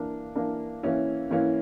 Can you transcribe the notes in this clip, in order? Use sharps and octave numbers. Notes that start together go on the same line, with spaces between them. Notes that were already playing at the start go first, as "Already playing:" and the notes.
Already playing: E3 A#3 D4 A#4
E3 A#3 D4 A#4
E3 A#3 C#4 E4
E3 A#3 C#4 E4